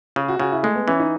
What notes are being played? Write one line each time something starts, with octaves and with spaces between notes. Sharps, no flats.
C#3 G#4
F#4
C#3 F#4
E4
G#3 A3
B3
E3 C#4
D#4